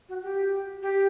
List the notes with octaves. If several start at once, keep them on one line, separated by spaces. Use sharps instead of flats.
F#4
G4
G4